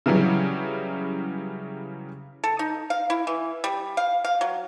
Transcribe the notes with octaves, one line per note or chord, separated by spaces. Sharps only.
C#3 E3 F#3 G3 C#4
A4
D#4
F5
E4
E3
G3
F5
F5
F#3